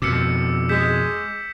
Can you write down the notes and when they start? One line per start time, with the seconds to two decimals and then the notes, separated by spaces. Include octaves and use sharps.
0.02 F2 B2 D6 E6 C#7
0.69 G#3 G6 B6 E7